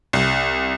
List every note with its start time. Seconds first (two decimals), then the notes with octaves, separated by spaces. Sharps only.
0.13 C2